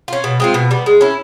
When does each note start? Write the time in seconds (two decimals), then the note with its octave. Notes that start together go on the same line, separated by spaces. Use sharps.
0.08 C#4 F4
0.24 B2
0.40 G#3 C4 F4
0.54 B2
0.71 G3 B3
0.86 G#3
1.01 C#4 E4